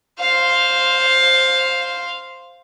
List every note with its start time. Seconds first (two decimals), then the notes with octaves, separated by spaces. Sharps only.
0.20 C5 F5